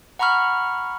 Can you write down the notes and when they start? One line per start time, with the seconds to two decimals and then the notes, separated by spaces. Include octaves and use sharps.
0.19 F#5 A#5 B5 C#6 F6